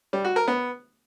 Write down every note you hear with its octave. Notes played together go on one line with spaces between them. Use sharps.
G3
F#4
A#4
B3